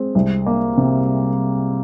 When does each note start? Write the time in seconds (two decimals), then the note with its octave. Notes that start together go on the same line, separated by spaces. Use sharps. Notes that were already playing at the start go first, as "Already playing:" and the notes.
Already playing: G#3 C4
0.15 C2
0.46 A#3
0.77 C3